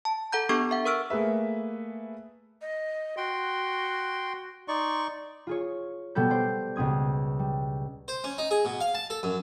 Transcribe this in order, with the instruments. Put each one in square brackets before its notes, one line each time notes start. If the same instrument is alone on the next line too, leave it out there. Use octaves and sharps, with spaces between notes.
[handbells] A5
A4 F#5 A#5 G6
B3 D4 G4 A4 C#6 D6
E5 F#5
A#4 C#6 E6 F6 D7
[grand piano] A3 A#3 G#4 B4 E5
[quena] D#5
[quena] F#4 [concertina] G5 C6
[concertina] D#4 D5 C#6 [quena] C6
[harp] F4 G#4 C#5
B2 G3 B3 A4 G6
C5 D5
C#2 B2 C4 D#6 G#6
G3
[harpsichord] C5
C#4
D#4
G#4
B2
F5
A5
A4
F#2